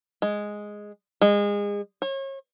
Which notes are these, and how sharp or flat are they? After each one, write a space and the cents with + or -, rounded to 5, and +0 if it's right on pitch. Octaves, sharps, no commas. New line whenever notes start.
G#3 +0
G#3 -30
C#5 -35